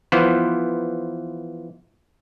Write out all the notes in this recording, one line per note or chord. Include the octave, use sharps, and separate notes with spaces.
E3 F3 B3 C5